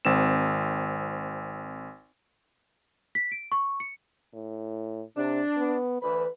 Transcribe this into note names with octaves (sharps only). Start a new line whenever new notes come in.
G#1 C4 E7
B6
D7
C#6
C#7
A2
C3 D4
B3
D2 E3 B4 B5